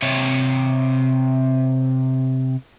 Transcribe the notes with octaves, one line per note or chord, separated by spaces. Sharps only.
C3 C#5